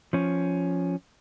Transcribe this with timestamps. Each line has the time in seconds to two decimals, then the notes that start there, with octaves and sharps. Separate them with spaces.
0.13 F3 C#4